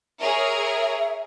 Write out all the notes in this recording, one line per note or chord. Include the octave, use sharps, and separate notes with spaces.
G#4 A#4 C#5 E5